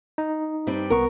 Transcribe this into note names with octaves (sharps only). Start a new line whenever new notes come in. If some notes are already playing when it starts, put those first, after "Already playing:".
D#4
G2 G3 C4
C2 B3 A#4 C#6